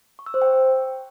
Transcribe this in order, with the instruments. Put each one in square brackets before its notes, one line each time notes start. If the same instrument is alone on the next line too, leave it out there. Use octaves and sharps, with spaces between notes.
[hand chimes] C#6
E6
C5
G5